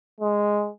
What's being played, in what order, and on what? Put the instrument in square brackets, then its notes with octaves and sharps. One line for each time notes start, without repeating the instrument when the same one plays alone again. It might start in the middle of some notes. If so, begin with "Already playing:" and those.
[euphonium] G#3